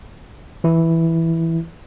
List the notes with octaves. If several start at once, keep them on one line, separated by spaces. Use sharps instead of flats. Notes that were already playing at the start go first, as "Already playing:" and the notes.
E3 E4